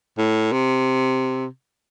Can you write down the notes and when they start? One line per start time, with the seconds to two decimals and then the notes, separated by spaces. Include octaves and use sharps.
0.18 A2
0.52 C3